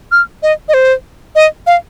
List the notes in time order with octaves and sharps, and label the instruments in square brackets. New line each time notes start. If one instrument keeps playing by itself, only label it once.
[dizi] F6
D#5
D#5
C5
D#5
F5